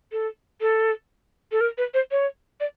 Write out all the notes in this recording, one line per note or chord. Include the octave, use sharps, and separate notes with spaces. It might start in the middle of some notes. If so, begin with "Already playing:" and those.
A4
A4
A4
A#4
B4
C5
C#5
D5